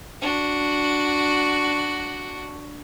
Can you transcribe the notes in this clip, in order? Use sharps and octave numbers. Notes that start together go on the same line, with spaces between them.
D4 F#4